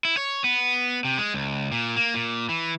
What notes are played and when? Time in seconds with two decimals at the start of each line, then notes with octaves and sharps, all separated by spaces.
0.05 E4
0.17 C#5
0.44 B3
1.05 C3
1.18 G#3
1.34 C#2
1.72 A#2
1.96 A#3
2.14 A#2
2.49 E3